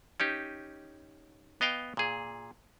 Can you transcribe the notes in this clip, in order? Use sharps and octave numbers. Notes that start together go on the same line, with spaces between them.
C#4 D#4 G4
B3 D#5 F5 G5
A#2 G#4